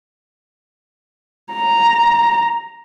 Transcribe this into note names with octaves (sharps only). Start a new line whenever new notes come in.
A#5